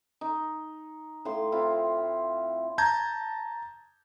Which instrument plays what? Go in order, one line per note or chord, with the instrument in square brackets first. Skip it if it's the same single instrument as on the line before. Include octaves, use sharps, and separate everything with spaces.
[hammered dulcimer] D#4
A2 F5 C6
C4 E4 F4
[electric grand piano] A5 A#5 G6 G#6